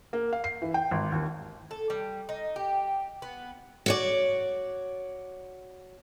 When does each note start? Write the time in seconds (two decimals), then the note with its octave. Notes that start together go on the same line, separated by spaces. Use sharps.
0.13 A#3
0.33 F5
0.44 C7
0.62 E3
0.74 G5
0.91 G#1
1.12 D#2
1.71 A4
1.90 G3
2.29 D#4
2.56 G4
3.22 B3
3.86 F#4 C#5 D5